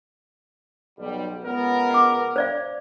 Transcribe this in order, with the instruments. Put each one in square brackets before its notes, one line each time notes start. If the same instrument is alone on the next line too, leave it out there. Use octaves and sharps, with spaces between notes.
[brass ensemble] B1 G3
C#2 B3 A#4
[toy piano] F#5 D6
C5 D5 F5